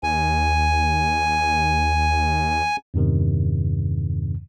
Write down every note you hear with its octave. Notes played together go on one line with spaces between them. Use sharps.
D#2 G#5
E2 G2 C3 D#3